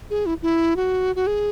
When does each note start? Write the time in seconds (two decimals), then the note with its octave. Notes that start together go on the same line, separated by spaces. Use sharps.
0.10 G#4
0.26 E4
0.42 E4
0.76 F#4
1.16 F#4
1.27 G#4